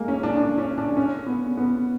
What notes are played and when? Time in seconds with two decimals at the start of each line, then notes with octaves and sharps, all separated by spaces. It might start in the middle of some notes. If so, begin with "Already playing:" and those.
Already playing: G#3 A#3
0.08 C#4
0.23 D4
0.37 D4
0.58 C#4
0.78 D4
0.97 C#4
1.26 B3
1.57 B3